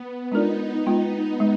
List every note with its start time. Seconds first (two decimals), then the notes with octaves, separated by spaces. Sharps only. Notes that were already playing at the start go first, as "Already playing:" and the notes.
Already playing: B3
0.32 G#3 D4 D#4 F4 A#4 D5
0.86 G#3 B3 F4
1.40 G#3